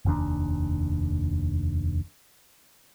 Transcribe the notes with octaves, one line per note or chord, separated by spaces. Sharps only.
F1 D#2 D4